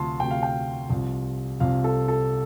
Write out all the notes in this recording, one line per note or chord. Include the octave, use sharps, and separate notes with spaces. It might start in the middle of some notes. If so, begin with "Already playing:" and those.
Already playing: D2 C3 F3 A5 C6
D2 C3 F3 G5
F5
G5
C2 C3 F3
C2 C3 F3 F5
A4
A4